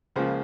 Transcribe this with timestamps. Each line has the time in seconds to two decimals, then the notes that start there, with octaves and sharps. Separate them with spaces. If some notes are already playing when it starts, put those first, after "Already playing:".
0.16 C#2 C#3 F3 A#3 C5